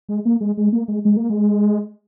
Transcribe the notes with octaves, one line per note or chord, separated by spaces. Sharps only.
G#3
A#3
G#3
G#3
A#3
G#3
G#3
A#3
G#3